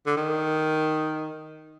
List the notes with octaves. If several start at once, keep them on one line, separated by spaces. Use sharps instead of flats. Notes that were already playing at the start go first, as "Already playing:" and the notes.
D3
D#3